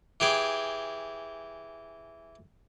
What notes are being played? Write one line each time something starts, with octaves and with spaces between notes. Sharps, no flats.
E3 G4 G#4 G5